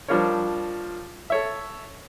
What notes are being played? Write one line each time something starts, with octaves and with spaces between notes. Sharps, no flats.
F3 G3 D4 F4 A#4 C#5
A4 C#5 E5